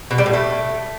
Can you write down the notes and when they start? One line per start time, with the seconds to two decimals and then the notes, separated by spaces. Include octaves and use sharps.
0.11 B2
0.18 G3
0.26 A2
0.33 A3